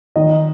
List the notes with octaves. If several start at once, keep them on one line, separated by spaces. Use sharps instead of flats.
D#3 D#5